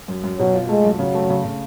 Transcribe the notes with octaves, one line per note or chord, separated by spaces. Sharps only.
F#2
F#2
B2 F#3
F4
G#3 A3
F#2
C#3 F#3
A3
C#3
C#3